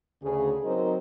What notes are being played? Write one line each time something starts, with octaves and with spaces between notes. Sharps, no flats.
D2 C#3 G#4
F#3 C4 D#4 A#4 C5 D#5